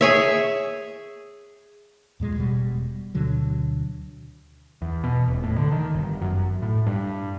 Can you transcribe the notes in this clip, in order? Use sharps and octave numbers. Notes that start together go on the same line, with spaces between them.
G#4 C#5 E5
E2 A#2 G#3
E1 B2 G3
D2 B2 D3 F#3
E2
B2
D#1
A2
D3
D#3
G1
F#2
A2
G2